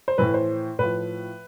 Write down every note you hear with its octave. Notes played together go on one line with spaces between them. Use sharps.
C5
A2 E3 B4
C5
A2 F3 B4